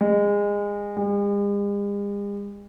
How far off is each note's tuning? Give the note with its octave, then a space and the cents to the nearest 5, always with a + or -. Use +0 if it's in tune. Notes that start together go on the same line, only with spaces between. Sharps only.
G#3 -25
G#3 -45